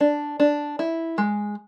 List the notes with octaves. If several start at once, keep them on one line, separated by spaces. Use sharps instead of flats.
D4
D4
E4
G#3